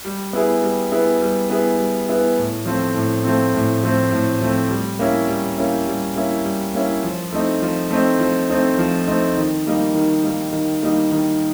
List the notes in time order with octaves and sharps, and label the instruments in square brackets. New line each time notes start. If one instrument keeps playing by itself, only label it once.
[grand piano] G3
B3 E4 G#4
G3
B3 E4 G#4
G3
B3 E4 G#4
G3
B3 E4 G#4
A2
F3 A3 C4
A2
F3 A3 C4
A2
F3 A3 C4
A2
F3 A3 C4
G3
A#3 C#4 E4
G3
A#3 C#4 E4
G3
A#3 C#4 E4
G3
A#3 C#4 E4
F3
A3 C4 D#4
F3
A3 C4 D#4
F3
A3 C4 D#4
F3
A3 C4 D#4
D#3
G3 A#3 D#4
D#3
G3 A#3 D#4
D#3
G3 A#3 D#4
D#3